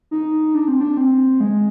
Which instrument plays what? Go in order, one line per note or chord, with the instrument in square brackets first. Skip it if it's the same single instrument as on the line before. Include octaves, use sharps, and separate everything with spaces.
[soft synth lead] D#4
D4
C4
D4
C4
G#3